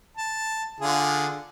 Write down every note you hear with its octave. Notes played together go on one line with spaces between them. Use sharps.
A5
D3 F4 G#4